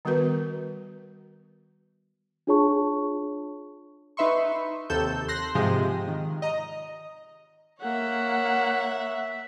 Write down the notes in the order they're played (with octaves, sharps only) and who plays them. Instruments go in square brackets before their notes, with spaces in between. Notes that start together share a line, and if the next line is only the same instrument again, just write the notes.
[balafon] D#3 G3 B3 F#4 A#4 B4
[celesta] D4 F4 G#4 C#5 A5 C#6
[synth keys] D#4 B4 E5 C6 C#6
D#2 C3 A4 E6 G6
C6 F#6 A#6
G#2 C3 F3 G#3 G4
D#3
D#5 A#5
[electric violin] A#3 F#5 [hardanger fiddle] C#5 E5